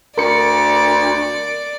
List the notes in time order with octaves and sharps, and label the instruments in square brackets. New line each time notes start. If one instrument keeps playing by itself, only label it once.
[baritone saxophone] D2 [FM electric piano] A#4 C#7 [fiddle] D5